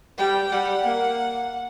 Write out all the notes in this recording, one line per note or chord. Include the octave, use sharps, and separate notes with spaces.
G3 G5
G3 F#5
A#3